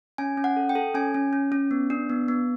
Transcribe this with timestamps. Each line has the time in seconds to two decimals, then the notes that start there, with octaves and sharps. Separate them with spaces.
0.18 C#4 G#5
0.37 C#4
0.44 F#5
0.57 A4
0.69 G5
0.75 A4
0.94 C#4 G#5
1.14 C#4
1.33 C#4
1.52 C#4
1.71 B3
1.90 D4
2.10 B3
2.28 B3